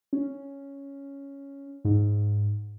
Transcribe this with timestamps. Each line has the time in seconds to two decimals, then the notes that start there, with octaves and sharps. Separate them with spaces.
0.13 C#4
1.85 G#2